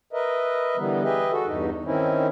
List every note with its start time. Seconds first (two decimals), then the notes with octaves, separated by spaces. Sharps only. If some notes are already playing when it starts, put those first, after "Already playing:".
0.13 A#4 B4 D#5 E5
0.77 D3 E3 G3 B3
1.03 G4 G#4 B4 D#5 E5
1.31 F#4 A4
1.46 E2 G2 D#4
1.85 D#3 C4 C#4 D#4 E4